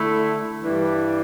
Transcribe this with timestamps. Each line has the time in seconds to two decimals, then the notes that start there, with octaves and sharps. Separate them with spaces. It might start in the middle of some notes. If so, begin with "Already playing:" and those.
Already playing: D3 A3 E4
0.61 G2 E3 G3 D4